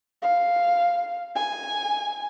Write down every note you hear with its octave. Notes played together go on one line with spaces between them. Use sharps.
F5
G#5